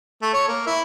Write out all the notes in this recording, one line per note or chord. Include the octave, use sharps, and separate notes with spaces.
A3
C#5
A#3
E4